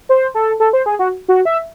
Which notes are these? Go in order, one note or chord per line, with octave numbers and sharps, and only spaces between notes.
C5
A4
A4
C5
G#4
F#4
F#4
E5